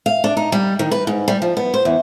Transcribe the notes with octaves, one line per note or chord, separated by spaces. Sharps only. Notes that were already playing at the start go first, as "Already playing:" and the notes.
F5
D4
D#4
G3
D#3
B4
G#2
G3
F3
B3
C5
E2